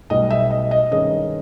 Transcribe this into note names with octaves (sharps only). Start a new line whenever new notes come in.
B1 B2 G3 D#5
E5
D#5
D#5
G2 D#3 G#3 C#4 D#5